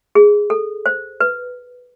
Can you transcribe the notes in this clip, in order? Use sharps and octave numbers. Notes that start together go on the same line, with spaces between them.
G#4
A4
C5
B4